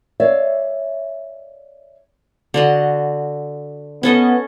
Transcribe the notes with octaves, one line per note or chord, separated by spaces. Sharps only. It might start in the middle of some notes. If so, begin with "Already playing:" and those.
C#5 D5 E5 F5
D3 F#4 D#5
B3 C#4 A4 D#5